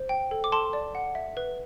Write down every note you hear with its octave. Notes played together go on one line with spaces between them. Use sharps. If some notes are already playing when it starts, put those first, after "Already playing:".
Already playing: C5
G5
A4
D6
A4 A5 C6
D5
F#5
E5
B4